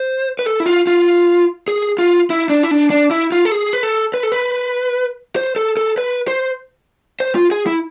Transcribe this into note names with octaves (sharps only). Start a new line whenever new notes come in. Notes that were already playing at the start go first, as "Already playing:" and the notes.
Already playing: C5
B4
A4
E4
F4
F4
G#4
F4
E4
D4
E4
D4
D4
E4
F4
A4
G#4
B4
A4
B4
A4
B4
C5
A4
A4
B4
C5
C5
F4
G#4
E4